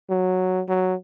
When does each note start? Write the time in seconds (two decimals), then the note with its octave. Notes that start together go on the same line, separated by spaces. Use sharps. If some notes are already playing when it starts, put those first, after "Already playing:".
0.10 F#3
0.68 F#3